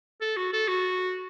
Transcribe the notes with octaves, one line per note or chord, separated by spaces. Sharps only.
A4
F#4
A4
F#4